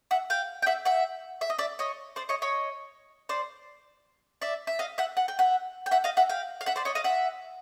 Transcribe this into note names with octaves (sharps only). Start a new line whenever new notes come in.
E5 F#5
F5 G5
G5
E5 F#5
E5 F#5
E5
D#5
D5 E5
C#5 D#5
C5 D5
C#5 D#5
C#5 D#5
C5 D5
D5 E5
E5
D#5 F5
E5 F#5
F#5
G5
E5 F#5
G5
E5 F#5
D#5 F5
E5 F#5
F5 G5
F5
E5 F#5
C5 D5
C#5 D#5
D#5 F5
E5 F#5